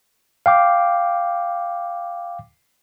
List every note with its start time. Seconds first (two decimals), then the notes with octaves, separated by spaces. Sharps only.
0.46 F5 G5 D6